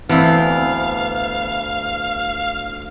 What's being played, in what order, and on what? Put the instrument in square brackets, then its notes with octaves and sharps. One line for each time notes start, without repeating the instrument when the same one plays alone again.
[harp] D2 E4 D5 [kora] E3 [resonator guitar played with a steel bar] B3 C4 [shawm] F5